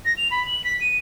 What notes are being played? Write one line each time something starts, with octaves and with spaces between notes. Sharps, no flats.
A#6
F7
B5
F#7
B6
D#7